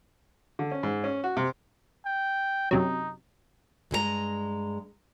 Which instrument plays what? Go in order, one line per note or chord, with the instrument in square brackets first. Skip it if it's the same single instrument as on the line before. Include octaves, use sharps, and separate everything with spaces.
[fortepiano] D3
C#4
G#2
C#4
F#4
C3
[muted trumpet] G5
[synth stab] F#2 C3 F#3 [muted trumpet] D#4
[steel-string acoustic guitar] G2 G#3 G#4 A#5